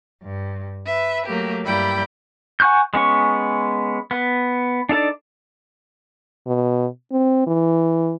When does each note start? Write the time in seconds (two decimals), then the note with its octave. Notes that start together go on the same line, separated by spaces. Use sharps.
0.22 G2
0.86 B4 E5
1.25 F#3 A3 A#3 G4
1.65 G2 G3 A#3 E4 G5 B5
2.60 F#5 G#5 C#6 F#6 G6
2.94 G#3 B3 C#4 C#6
4.11 B3
4.89 D4 D#4 A4 D5
6.47 B2
7.12 C4
7.47 E3